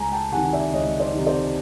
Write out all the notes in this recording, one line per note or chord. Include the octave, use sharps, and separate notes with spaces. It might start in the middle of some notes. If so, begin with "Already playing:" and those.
Already playing: C#2 G#5 A#5
G5 A5
C3 D#3 F#5 G#5
D5 E5
C#2 C#5 D#5
C5 D5
C3 D#3
C5 D5